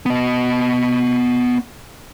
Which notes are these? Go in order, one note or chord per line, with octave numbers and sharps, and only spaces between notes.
B3 D#5